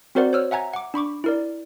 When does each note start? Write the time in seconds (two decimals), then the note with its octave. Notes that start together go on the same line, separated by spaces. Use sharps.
0.15 C4 F#4 A#4 C5 D5 F#5
0.33 C5 C#5 E6 F6
0.51 E5 F#5 G#5 A#5 G#6
0.73 F#5 D6
0.94 D4 B5 C#6 D6
1.24 E4 A#4 D5